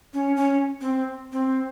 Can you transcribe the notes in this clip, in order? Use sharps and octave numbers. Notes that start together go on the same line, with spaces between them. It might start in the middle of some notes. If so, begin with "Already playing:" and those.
C#4
C#4
C4
C4